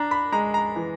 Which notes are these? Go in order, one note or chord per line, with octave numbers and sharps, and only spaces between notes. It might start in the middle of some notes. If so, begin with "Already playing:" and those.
Already playing: D4 A#5
B5
G#3 A#5
A#5
E3